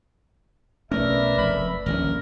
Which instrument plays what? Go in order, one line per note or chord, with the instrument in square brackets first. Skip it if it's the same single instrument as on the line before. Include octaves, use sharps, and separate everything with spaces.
[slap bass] B1 A3 C#4 [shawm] A#4 [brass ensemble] B4 D5 E5
[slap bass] F1 [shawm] B5
[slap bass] D#1 A#1 C#4 [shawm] A#4